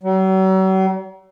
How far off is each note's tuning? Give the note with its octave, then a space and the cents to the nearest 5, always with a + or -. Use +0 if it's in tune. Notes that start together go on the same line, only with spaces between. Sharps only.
F#3 +45